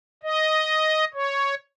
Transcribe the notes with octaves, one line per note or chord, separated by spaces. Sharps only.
D#5
C#5